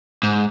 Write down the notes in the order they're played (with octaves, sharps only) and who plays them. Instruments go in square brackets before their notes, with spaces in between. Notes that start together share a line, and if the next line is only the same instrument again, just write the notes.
[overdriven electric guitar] G#2